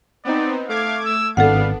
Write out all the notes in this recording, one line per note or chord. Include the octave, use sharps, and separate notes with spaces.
B3 C4 D#4 D5
A3 F5 D6 G#6
E6
G#1 B3 D4 A4 F5 F#5